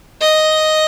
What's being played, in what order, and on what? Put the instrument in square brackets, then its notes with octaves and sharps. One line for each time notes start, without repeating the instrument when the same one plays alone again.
[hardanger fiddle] D#5